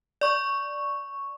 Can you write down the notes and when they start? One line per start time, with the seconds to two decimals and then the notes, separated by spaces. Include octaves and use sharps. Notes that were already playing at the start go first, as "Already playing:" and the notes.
0.21 D5 C#6